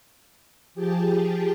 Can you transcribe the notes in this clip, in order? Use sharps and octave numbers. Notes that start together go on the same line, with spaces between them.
F3 G4 G#4 G5 A5